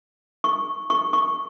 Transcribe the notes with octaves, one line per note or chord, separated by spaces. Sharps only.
C#6
C#6
C#6